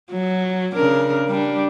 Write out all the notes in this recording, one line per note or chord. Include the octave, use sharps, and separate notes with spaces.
F#3
C#3 D4 A#4
G3 D4